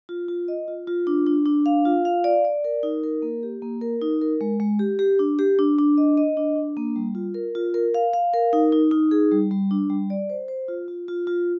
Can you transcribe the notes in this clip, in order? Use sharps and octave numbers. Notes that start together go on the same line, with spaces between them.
F4
F4
D#5
F4
F4
D4
D4
D4
F5
F4
F5
D5
D5
A#4
D#4
A#4
A#3
G4
A#3
A#4
D#4
A#4
G#3
G#3
G4
G4
D4
G4
D4
D4
D#5
D#5
D4
D4
A#3
G3
F4
A#4
F4
A#4
F5
F5
A#4
D#4
D#4
D#4
G#4
G3
G3
D4
G3
D5
C5
C5
F4
F4
F4
F4